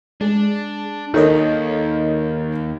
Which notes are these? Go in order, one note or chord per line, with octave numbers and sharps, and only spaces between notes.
G#3 D4 G#4
D#2 D#3 A4 C#5 D#5